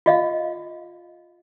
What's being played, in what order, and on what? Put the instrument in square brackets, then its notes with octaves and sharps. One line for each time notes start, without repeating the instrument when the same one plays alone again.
[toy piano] F4 D#5 F5